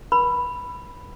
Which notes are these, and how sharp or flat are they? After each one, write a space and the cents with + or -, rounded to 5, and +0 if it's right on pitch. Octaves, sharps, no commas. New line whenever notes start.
B4 -40 B5 +0